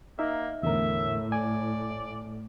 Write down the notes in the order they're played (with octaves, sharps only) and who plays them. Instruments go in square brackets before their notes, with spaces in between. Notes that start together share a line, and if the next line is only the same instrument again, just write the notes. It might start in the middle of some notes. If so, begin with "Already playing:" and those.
[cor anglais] A#3 [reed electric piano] D#4 E5
[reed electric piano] E2 D3 A#4 [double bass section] A2 [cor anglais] E5
[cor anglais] D5 [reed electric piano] G#5